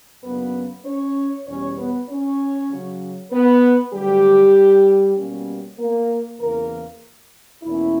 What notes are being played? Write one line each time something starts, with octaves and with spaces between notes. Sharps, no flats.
F#2 C#3 F#3 A#3 B3 D4 B4
C#4 C#5
E2 B2 G3 C#4 C#5
B3 B4
C#4 C#5
C#3 F#3 C#4
B3 B4
D2 D3 F#3 G3 G4
B2 G3 A#3 C#4
A#3 A#4
E2 C#3 E3 A#3 A#4
E2 B2 A#3 C#4 E4